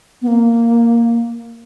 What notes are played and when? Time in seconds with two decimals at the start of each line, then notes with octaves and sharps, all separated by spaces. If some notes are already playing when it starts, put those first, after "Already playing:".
0.22 B3
0.27 A#3